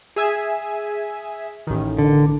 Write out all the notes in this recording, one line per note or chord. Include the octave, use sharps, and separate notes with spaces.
G#4 E5 G#5
A1 D#3
D3